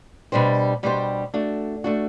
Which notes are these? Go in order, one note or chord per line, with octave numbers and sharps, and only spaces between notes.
B2 G3 D4 G4 C5
B2 G3 D4 G4 C5
A3 D4 F#4
A3 D4 F#4